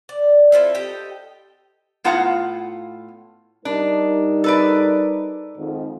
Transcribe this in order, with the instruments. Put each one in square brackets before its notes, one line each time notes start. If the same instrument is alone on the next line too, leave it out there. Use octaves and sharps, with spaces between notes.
[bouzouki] D5
C4 E4 F4 A4
G4 A4 D#5 G5
[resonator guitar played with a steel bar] A2 B3 F4 F5 F#5 A#5
[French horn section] G3 D#4 A#4 [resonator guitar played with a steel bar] D4
[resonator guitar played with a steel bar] A4 B4 D5
[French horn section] F2 G#2 D#3